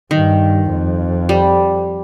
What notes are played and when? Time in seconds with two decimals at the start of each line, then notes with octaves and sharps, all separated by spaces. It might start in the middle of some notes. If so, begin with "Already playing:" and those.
0.11 G2 D#3
0.70 F2
1.29 G3